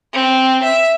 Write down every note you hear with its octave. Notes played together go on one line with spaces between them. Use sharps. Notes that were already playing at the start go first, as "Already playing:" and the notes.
C4
E5